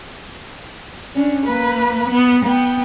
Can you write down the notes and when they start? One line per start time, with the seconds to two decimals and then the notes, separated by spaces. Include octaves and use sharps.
1.15 C#4 D4
1.46 A#3 B4
2.10 B3
2.45 B3 G5